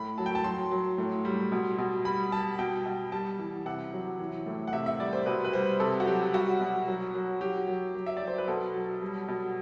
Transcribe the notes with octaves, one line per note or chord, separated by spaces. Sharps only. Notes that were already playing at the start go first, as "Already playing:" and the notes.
Already playing: A2 B5
F#3 A5
G5
A5
F#3 C6
F#3
A2
G3
B2
B2
G3 B5
G3 A5
B2 G5
B2
G3 A5
E3
C3 F#5
F#3
E3
A2
F#5
C3 E5
E5
G3 D5
C5
B2 B4
B4
G3 C5
C3 A4
F#4
F#3 G4
G3 F#4
B2
F#3
F#3
F#3 G4
F#3
F#3
E5
F#3 D5
C5
B4
B2 A4
F#3
G3
B2